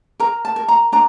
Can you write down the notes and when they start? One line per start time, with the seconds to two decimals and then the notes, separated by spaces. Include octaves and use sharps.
0.20 A#4 A#5
0.45 A5
0.56 A#4
0.68 A#5
0.92 D4 A#5